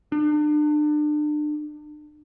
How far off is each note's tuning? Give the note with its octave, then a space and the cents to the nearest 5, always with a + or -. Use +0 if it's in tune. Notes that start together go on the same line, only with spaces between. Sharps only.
D4 +35